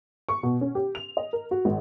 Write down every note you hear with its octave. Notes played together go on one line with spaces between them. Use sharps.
C#6
B2
C#4
G4
F7
D#5
A#4
F#4
G#1